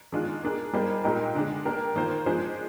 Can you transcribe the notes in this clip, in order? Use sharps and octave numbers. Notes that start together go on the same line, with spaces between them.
D#3 G#3 D4 F4
A#3 D4 G#4
G3 A#3 D#4 G#4 C5
A#2 G#3 D#4 G4 A#4
D3 G#3 D4
A#3 D4 G4 A#4
D#3 A#3 F4 C5
F3 G#3 D4 G#4 C5